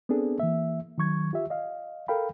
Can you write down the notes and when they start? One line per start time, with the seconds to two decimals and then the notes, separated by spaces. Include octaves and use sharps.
0.09 B3 C4 D4 G#4 A4
0.39 E3 A#3 E5
0.98 D#3 F#3 C#6 G#6
1.33 F4 G4 E5
1.50 D#5 F5
2.08 A4 A#4 F5 G5 B5